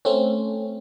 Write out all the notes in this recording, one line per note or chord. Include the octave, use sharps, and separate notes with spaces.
A3 C4 C#4